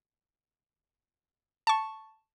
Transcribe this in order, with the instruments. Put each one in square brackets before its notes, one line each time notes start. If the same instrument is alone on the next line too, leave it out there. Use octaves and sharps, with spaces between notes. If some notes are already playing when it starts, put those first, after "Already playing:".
[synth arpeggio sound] A5 C#6